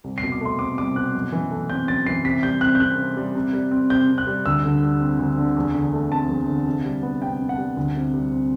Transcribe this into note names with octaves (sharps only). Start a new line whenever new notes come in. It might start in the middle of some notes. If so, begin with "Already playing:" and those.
C2
C7
B2
D6
A3 C6
C4 D6
C2 D6
B2 F#6
F#2
E3
A3
C4 G6
F#2 A6
E3 C7
C3 B6
G3 G6
C4 F#6
G6
C3 F#6
C3
G3
C3
G3
C4
C3 G6
C3
F#6
G3
D2 E6
D3
G3
C4
D2
D3
E2
D3
A3
C4 A5
E2
D3
C3
G3
B3
C3 G5
C3
F#5
G3
D2
C3
G3
C4